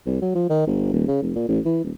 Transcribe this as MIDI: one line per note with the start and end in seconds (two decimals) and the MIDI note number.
0.06 0.19 36
0.22 0.34 54
0.35 0.46 53
0.49 0.65 51
0.67 0.92 31
0.93 1.06 27
1.08 1.19 49
1.22 1.34 29
1.35 1.44 46
1.48 1.59 33
1.65 1.80 52
1.84 1.92 27